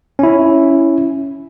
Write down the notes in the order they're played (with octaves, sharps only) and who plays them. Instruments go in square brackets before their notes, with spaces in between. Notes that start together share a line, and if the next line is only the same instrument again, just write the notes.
[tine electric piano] C#4 E4